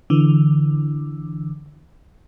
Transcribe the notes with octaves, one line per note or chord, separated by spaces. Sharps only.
D3 E3